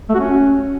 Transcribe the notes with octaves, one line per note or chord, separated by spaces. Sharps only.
A3
F#4
C#4